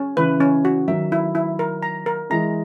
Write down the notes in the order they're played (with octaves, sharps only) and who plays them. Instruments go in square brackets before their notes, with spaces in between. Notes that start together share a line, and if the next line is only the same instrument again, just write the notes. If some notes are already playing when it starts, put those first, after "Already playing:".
Already playing: [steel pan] C#4
[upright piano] C#3 E3 [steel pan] B4
[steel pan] C#4
F#4
[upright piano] D#3 F#3 [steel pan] E5
[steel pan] E4
E4
A#4
A#5
A#4
[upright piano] E3 G#3 [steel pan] A#5